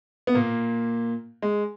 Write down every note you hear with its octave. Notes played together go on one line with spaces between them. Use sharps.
B3
A#2 A#3
G#3